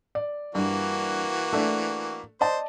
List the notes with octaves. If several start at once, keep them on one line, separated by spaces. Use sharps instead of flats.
D5
G2 E3 A#3 F#4
A3 D4
C5 D5 D#5 A5